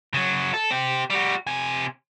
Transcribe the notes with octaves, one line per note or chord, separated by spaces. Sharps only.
C#3 F#3
A4
C4 G4
G3 F#4
C3 G#5